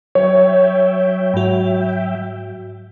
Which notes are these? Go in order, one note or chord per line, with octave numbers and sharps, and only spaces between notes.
F#3 C#5 E5 G5
G#2 F#4